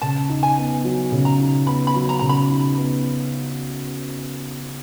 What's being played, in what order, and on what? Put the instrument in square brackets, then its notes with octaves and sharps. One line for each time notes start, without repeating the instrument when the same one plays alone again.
[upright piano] C#3 [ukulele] A5
[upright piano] D#4
[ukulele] G#5
[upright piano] B3
F#3
C#3
[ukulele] A#5
[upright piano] D#4
[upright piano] B3 [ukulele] B5
[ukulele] B5
[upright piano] F#3
[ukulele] A#5
[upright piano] C#3 [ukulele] A#5
[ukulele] B5
[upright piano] D#4
B3